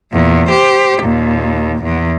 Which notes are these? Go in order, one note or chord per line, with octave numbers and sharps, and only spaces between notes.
E2 A#2
G4 C5
D#2 A#2
E2